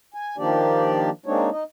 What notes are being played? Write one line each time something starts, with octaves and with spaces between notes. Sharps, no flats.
G#5
D#3 F3 A#3 D4 G4 D5
G#3 A#3 C4 D4 D#4 C#5
D#4 D#5